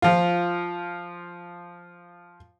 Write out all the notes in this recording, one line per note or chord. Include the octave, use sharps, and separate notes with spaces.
F3 F4